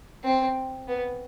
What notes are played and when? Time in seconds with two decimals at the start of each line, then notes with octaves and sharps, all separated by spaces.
0.24 C4
0.88 B3